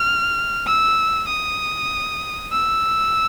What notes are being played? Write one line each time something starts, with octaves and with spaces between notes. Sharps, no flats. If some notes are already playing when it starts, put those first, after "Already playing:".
Already playing: F6
E6
D#6
E6